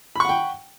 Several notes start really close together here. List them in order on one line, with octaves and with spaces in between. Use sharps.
B5 C#6 F#5 G5